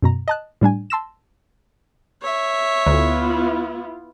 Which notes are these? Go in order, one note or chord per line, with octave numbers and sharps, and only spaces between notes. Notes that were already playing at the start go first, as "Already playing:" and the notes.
F#2 B2 A#5
D#5 A5 F#6
A2 G3 D4 G#5
A5 C6 E6 A#6 E7
C#5 E5
D2 B3 E4 F4